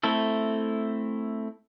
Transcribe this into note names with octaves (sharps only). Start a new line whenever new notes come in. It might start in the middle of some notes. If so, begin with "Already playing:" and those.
A3 C4 E4 A4